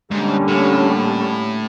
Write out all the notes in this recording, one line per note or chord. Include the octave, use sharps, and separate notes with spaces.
G#2 D3 G3 A#3 C#4
A2